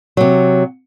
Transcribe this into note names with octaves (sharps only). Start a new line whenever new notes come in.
C3 F#3